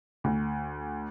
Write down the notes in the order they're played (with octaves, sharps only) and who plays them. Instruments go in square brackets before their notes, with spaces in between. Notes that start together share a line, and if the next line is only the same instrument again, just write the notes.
[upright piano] D2